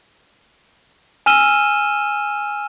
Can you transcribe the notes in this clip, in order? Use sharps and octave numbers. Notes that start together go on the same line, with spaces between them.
G#5 E6 F6 D#7 E7 G7